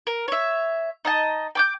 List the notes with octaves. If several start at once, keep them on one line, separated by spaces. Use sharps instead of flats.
A#4
C#5 E5
D#4 D#5 A5
G5 D6 G6